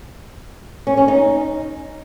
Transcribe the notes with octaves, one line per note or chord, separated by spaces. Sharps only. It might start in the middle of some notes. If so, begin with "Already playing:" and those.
C#4
C#4
D#4